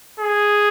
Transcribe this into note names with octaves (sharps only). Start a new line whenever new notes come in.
G#4